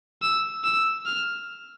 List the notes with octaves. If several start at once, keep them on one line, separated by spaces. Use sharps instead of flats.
E6
E6
F6